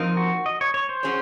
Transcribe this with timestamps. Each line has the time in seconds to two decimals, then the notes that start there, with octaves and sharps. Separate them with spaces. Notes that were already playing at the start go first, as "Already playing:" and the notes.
Already playing: A#2 F3 C4 D#4 A#4
0.17 F#4
0.46 D#5
0.61 C#5
0.74 C#5
0.89 C5
1.03 F#3 C#4 G#4 C#5